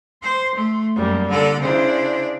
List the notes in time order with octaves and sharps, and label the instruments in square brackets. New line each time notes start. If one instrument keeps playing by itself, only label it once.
[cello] C5 [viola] C6
[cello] A3
[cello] F#2 [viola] G3 A#3
[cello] D3 A4 [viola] A#3
[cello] C#3 D4 [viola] E4 C5